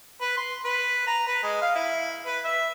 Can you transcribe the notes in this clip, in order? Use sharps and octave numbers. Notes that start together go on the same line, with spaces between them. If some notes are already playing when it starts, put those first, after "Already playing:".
B4
C6
B4
A#5
B4
G#3
F5
E4
B4
E5